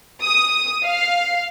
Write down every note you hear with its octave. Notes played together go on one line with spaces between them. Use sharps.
D#6
F5